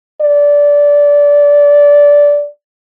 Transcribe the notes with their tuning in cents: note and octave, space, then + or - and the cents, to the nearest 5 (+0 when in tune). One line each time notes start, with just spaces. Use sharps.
D5 -15